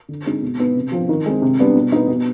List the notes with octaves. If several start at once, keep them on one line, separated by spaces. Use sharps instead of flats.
D3
G#3 C4 D#4
B2
B3 D#4
C3
F3 C4
D#3
G#3 C4
C3
G3 B3 D4
B2
B3 D#4
B2